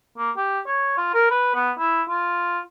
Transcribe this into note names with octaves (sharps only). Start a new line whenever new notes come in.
A#3
G4
C#5
F4
A#4
B4
B3
E4
F4